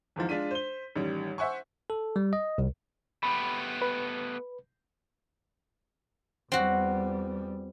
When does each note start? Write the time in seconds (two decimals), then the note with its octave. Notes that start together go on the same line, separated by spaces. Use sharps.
0.16 E2 G#2 E3 F3
0.29 G#3 D4 F4 B6 D#7
0.51 C5 G7
0.96 A1 D#3 G3
1.38 C5 E5 F#5 G#5 C#6
1.90 A4
2.16 G3
2.33 D#5
2.58 C2
3.23 A3 B3 G4 B5
3.82 B4
6.52 E2 G3 C4 F#4